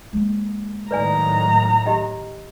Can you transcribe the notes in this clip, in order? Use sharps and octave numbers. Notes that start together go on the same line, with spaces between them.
G#3 A#3
A2 D#3 F#3 B4 D5 G#5 A#5
G4 D#5 G5